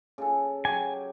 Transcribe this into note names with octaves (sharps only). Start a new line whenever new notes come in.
C#3 A4
F#3 G4 G#5